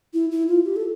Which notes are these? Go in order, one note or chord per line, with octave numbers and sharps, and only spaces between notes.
E4
E4
F4
G4
A4